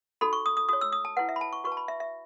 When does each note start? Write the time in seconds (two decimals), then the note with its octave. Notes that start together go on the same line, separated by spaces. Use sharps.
0.21 D#4 F#4 A4 B5
0.33 C#6
0.46 D#6
0.57 D#6
0.69 F#4 C#5 D#6
0.81 E6
0.93 D#6
1.05 A5
1.17 E4 B4 F#5
1.29 E5
1.36 B5
1.41 A5
1.53 C#6
1.64 F#4 B4 C#6
1.72 A5
1.77 B5
1.88 E5
2.00 E5